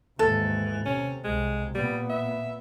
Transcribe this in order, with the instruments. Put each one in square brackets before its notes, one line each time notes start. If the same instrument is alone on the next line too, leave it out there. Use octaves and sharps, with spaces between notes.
[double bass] D#2 G#2 [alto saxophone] E3 [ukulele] A4
[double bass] C3 [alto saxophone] C#4
[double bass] C2 [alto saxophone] G#3
[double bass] A#2 B3 [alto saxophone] G3
[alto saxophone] E5